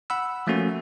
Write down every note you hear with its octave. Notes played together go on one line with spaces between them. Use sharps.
F#5 B5 E6
F3 A3 A#3 C#4 F#4